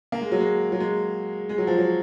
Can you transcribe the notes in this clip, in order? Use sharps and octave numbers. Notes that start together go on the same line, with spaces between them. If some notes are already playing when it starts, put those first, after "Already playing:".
A#3
G#3
F#3
G#3
F#3
G#3
G#3
F#3
F3
F#3